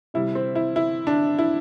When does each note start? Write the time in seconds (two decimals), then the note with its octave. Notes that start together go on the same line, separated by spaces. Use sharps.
0.14 C3 G3 E4
0.35 C4
0.56 E4
0.76 E4
1.07 D4
1.39 E4